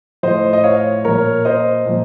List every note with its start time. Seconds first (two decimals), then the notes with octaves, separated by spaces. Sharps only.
0.23 A2 F3 C5 D#5
0.53 D#5
0.64 C#5 F5
1.04 A#2 F3 A#4 C#5
1.45 C5 D#5
1.86 A#2 F3